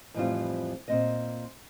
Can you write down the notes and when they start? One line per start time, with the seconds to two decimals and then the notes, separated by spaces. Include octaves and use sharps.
0.14 F2 A2 E3 G3 C4 F4
0.88 A#2 C4 D#5